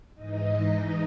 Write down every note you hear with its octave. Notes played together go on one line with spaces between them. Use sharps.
G#2 E3 D#4 D#5